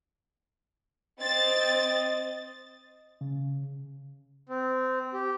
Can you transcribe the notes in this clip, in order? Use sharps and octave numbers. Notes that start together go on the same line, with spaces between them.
C4 D#5 A6
C#3
C4
G4